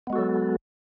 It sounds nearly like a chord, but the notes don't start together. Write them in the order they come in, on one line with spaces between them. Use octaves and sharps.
B3 G#3 F#4 A4 F#3